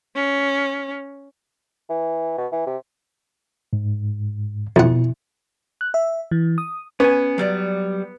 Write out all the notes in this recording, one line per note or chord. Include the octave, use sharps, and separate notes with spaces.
C#4
E3
B2
E3
C3
G#2
F2 B2 E4 F#5
F#6
E5
E3
D#6
B3 C#4 G#5
F#3 G3 D5